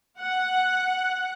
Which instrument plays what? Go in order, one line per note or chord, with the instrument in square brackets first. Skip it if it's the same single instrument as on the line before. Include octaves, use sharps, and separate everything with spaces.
[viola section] F#5